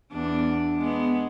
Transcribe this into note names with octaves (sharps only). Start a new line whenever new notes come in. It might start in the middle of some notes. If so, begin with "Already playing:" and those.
E2 D4
G#3 B3